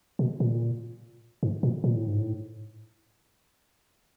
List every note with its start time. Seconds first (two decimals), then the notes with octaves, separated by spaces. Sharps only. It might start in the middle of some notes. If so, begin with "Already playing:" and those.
0.19 B2
0.40 A#2
1.43 G#2
1.63 A#2
1.84 A#2
1.96 A2
2.08 G#2
2.20 A2